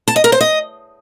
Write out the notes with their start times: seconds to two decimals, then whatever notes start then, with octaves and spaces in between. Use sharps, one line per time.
0.08 A5
0.16 D#5
0.24 A#4
0.32 C5
0.41 D#5